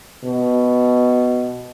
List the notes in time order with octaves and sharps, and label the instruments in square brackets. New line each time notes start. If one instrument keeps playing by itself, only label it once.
[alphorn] B2